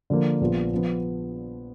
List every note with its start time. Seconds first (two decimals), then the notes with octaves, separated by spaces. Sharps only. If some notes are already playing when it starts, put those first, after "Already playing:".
0.10 D3 F3 A#3
0.41 A#1 A#2 F3 B3 F4
0.74 F3 B3